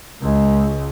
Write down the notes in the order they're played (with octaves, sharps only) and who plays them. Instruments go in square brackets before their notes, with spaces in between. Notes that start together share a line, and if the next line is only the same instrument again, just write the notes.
[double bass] C#2 [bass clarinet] G#3